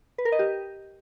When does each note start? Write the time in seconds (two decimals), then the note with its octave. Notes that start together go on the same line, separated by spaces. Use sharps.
0.18 B4
0.25 A#4
0.32 D#5
0.39 G4